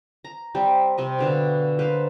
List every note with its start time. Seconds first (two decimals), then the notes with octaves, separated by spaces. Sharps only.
0.24 A#5
0.55 G3 C4 G4
0.98 C3 C4 D#5
1.19 B2 D3 F5
1.79 A#3 B4 C5 F5